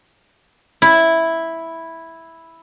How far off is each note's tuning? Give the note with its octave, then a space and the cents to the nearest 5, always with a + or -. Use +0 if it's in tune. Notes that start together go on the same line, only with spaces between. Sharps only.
E4 -5